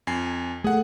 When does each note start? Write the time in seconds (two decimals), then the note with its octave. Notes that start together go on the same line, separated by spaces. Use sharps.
0.07 F2 G#5 C7
0.64 A3 G#4 F#5